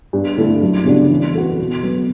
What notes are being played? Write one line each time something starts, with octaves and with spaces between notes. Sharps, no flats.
G2
D3 A3 E4 A4
F#2
C#3 G3 D4 F#4
E3
B3 F#4 A4
B2
F#3 B3